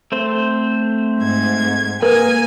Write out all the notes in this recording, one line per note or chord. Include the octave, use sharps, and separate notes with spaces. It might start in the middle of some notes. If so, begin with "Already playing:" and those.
A3 C4 C5
G#2 G#6
A#3 G#4 A#4 B4 G#5